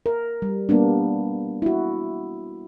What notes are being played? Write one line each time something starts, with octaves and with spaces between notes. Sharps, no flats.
A#4
G3
G3 A#3 B3 D4
E4 F#4